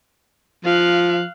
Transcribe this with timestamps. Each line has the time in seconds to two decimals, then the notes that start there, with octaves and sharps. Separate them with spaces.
0.65 F3 F5 F#6